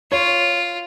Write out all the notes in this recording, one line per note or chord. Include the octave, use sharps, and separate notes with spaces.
F4 C#5